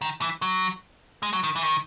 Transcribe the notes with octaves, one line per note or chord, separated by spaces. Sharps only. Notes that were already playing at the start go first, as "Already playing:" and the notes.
D#3
E3
F#3
G#3
F#3
D#3
E3
D#3